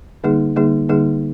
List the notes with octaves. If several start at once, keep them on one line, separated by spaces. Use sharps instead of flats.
D3 G3 A#3 D#4 G#4
D3 G3 A#3 D#4 G#4
D3 G3 A#3 D#4 G#4